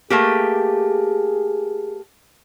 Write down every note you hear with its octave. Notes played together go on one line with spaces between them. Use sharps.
A3 A#3 G4 G#4